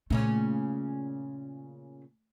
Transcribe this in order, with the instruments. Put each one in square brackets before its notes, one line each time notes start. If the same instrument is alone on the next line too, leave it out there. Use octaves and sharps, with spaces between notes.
[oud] A#2 C#3 C#4 [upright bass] A3